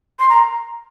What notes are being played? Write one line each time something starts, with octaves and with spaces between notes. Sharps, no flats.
C6
A#5